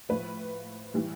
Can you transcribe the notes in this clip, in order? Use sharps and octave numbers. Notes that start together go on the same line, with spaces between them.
A2 F3 B4
A2 E3 G3